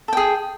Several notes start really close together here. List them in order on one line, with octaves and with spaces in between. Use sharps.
A4 G5 G#4